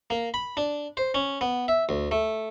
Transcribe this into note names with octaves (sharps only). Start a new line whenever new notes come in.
A#3
B5
D4
C5
C#4
B3
E5
D2
A3